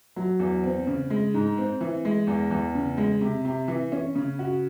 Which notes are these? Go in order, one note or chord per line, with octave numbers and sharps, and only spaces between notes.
F#3
E2
C4
C#3
G#3
G#2
C4
E3
G#3
E2
E2
C#3
G#3
C3
C3
E3
C#4
C#3
F#4